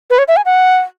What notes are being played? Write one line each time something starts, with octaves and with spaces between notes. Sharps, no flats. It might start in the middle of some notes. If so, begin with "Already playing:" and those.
B4
C#5
E5
G#5
F#5